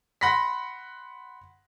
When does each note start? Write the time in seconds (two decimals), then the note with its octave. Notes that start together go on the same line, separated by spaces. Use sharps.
0.21 F#5 B5 C6 A#6 B6